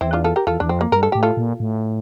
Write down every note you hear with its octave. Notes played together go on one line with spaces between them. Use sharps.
E2 C4 E4
D4 F4
F4 A4
G4 A#4
E2 F4 A4
E2 D4
F2 C4
A#3
G2 A#4
A4
A2 G4
F4 A4
A#2
A2